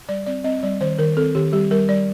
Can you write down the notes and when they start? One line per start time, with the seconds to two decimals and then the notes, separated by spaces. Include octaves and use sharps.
0.09 G3 D5
0.26 C4 D5
0.44 C4 D#5
0.63 G3 D5
0.81 D#3 C5
0.99 D#3 A#4
1.17 C4 A4
1.35 D#3 G4
1.53 G3 G4
1.71 G3 A#4
1.89 G3 D5